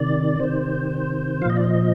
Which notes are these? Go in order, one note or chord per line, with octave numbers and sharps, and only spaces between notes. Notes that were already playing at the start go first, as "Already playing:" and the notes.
Already playing: C3 D#3 D5
C3 D#3 C5
A#2 F3 D#5 F5
D5
D#5